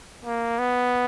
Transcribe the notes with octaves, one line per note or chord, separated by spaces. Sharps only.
A#3
B3